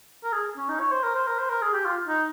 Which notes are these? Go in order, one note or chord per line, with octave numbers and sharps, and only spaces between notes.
A#4
G#4
C#4
D#4
C#5
C5
A#4
C5
A#4
C5
A#4
G#4
G4
F4
D#4